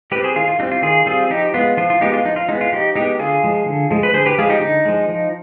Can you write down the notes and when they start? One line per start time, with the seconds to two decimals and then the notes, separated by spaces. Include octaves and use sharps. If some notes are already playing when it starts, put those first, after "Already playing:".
0.11 G3 G4 B4
0.16 C4
0.24 G#4 C5
0.35 D#3 F4 G#4
0.48 F4
0.59 G3 D#4
0.63 C4
0.72 F4
0.82 D#3 F4 G#4
1.06 G3 C4 F4 G#4
1.30 F3 D#4 G4
1.54 G#3 B3 F4
1.77 F3 F4
1.90 F4
2.01 G#3 B3 D#4 G4
2.14 F4
2.25 F3 D#4
2.36 F4
2.49 G#3 B3 D#4
2.61 F4
2.72 F3 D#4 G4
2.95 G#3 B3 D#4 G4
3.19 D3 F4 G#4
3.44 F3 G#3
3.66 D3
3.91 F3 G#3
4.03 B4
4.14 D3 G#4 C5
4.26 G4 B4
4.38 F3 G#3 F4 G#4
4.49 D#4 G4
4.61 D3 D#4
4.85 F3 G#3
5.09 F3